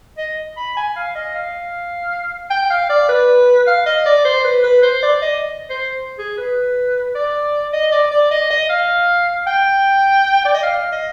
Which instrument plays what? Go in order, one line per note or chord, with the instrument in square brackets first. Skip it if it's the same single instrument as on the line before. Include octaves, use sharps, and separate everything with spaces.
[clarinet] D#5
B5
G#5
F5
D#5
F5
G5
F5
D5
B4
F5
D#5
D5
C5
B4
B4
C5
D5
D#5
C5
G#4
B4
D5
D#5
D5
D5
D#5
D#5
F5
G5
D5
D#5
F5
D#5